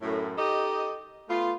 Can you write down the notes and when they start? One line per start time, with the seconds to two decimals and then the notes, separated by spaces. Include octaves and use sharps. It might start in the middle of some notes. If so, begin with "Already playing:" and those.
0.02 F#2 A2
0.37 D#4 G4 A4 D#5
1.29 A3 B3 F4